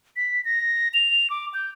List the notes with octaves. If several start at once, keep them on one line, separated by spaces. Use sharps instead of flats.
B6
A#6
F7
D6
G6